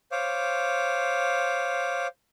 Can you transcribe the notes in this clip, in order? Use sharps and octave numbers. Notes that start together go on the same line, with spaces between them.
C5 C#5 F5 D6